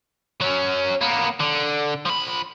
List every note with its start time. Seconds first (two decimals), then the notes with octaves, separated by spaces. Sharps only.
0.41 F#3 C#4
1.01 A#3 B3
1.40 D3
2.06 F3 B5